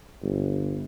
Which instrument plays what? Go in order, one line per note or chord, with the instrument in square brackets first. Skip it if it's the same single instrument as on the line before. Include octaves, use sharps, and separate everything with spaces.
[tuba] G1